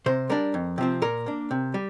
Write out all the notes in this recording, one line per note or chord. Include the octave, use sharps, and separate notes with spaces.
C3 C5
G3 D4 A#4
F2
C3 F3 C4
A#2 A#4
A#3 D4
C3
G3